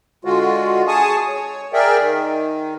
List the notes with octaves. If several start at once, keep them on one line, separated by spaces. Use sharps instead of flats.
D3 G#3 F4 F#4
G#4 G#5 A5 C#6 D#6
C#5
G#4 A#4 D5 E5 G5
D#3